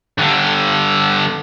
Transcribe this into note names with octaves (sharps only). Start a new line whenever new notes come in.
G2 D3